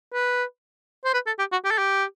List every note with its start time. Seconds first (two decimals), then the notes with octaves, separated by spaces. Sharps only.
0.13 B4
1.05 C5
1.14 B4
1.26 A4
1.39 G4
1.52 F#4
1.65 G4
1.71 A4
1.78 G4